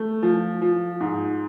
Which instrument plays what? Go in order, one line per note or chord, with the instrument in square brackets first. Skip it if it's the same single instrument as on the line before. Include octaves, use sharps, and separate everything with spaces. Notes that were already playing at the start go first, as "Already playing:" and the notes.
Already playing: [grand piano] A3
F3
F3
G#2